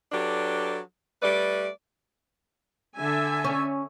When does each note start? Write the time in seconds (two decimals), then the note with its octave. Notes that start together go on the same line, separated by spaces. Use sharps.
0.12 F#3 D4 G4 A4 B4
1.21 G3 A3 B4 D5
2.96 D3 E5 G#5
3.44 C#4